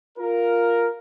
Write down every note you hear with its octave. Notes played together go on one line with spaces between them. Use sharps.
F4 A#4